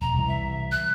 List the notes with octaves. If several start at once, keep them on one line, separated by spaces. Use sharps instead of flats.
E1 A#5
C2 E3
E5
F#6